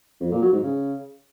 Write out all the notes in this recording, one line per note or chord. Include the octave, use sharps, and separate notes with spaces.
F2
A#2
F#3
G#2
C#3